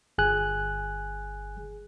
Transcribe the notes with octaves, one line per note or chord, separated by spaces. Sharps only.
G1 G#4 G#5 F#6